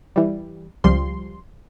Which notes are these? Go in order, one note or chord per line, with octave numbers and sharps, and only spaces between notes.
E3 G3
C#2 F3 G3 C6